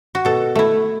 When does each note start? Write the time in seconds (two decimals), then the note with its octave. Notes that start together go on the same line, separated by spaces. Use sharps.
0.15 F#4
0.25 B2 A4
0.55 A3 E4